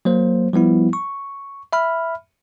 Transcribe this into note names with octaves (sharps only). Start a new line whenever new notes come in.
F#3 A#3 C5
F3 G3 B3 E4
C#6
E5 B5 F6